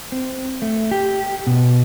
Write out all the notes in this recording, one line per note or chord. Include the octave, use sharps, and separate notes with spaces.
C4
A3
G4
B2